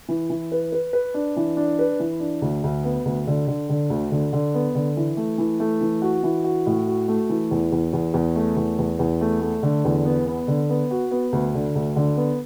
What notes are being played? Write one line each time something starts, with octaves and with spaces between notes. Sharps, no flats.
E3
E3
B4
B4
B4
D4
E3
D4
B4
E3
D4
D2
D2
B3
D2
D3
D3
D3
D2
D3
D3
B3
D3
E3
A3
E3
A3
E3
F#4
E3
F#4
A2
F#4
A3
E3
E2
E2
E2
E2
A3
E2
E2
E2
A3
A3
D3
E2
B3
B3
D3
B3
F#4
B3
D2
D3
D2
D3
B3